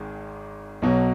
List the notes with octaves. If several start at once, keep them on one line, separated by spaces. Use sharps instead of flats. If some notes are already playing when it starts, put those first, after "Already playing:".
Already playing: G#1 G#2 D#3 G#3
B1 B2 F#3